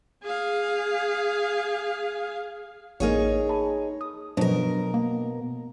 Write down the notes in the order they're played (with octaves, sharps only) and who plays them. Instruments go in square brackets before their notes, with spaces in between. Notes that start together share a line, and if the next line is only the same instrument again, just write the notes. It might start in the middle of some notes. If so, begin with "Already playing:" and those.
[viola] G#4 F5
[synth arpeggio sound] A1 A#3 A#4 [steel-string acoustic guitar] D#4 G#4 C#5
[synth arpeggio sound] D#5 A5 B5
D#6
[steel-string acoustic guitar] B2 A#4 [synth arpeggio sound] F3 F#3 D4
[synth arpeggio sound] A#3